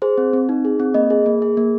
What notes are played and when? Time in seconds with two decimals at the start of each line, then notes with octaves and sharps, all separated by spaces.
0.02 G#4 C5
0.18 C4
0.33 C4
0.49 D#4
0.65 G#4
0.80 C4
0.94 A#3 D#5
1.10 G#4
1.26 A#3
1.42 G#4
1.57 A#3